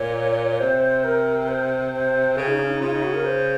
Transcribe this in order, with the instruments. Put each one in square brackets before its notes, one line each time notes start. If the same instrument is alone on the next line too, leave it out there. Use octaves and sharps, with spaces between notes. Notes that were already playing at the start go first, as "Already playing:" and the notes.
Already playing: [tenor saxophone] A#2 [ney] C#5
[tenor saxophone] C3 [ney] C5
[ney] A#4
C5
C5
[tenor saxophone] C#3 [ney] G#4
[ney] D#4
C#4
D#4
[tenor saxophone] C#3 [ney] F4
[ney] D#4
F#4
A#4
C5